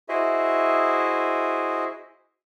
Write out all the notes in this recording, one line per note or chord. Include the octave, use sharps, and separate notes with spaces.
E4 F#4 G#4 C5 D#5 E5